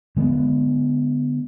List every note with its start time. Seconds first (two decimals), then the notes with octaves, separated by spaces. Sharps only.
0.16 D3 G#3 A3 B3